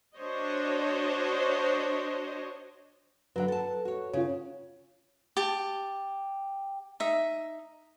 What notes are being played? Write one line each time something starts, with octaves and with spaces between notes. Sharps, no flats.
D4 F#4 C5 C#5 D#5
D3 F#3 B4 F#5
A4 A5
F#4 C#5
C#3 F4 C#5
G4 A5
D#4 E5